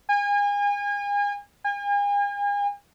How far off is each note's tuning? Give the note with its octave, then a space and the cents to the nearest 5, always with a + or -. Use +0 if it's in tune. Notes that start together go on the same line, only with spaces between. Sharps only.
G#5 -35
G#5 -40